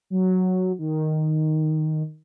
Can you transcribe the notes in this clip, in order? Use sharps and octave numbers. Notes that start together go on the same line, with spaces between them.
F#3
D#3